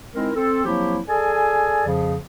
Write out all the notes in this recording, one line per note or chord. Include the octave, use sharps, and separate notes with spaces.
G#3 C4 D#4 E4 A#4
C4 A4
F3 F#3 A#3 C4 E4 G4
G#4 A4 D5 G#5
F2 C#3 F3